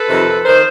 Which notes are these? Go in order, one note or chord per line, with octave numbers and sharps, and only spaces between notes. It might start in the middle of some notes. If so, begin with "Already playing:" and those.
Already playing: A4 B4
F2 C3 D#3
D#3 A#4 C5